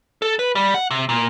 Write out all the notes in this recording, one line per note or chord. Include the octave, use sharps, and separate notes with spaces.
A4
B4
G3
F#5
C3
A#2